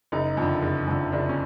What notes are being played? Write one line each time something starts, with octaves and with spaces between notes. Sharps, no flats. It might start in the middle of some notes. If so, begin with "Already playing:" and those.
F#1 D#4
F2 D3
F#1
F2 D3
F#1 D4
C#4